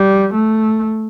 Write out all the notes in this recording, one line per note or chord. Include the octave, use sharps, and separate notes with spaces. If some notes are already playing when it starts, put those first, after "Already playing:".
Already playing: G3
A3